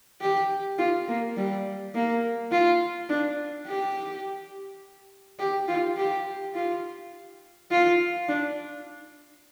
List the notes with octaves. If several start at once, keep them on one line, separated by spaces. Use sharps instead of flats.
G4
F4
A#3
G3
A#3
F4
D4
G4
G4
F4
G4
F4
F4
D4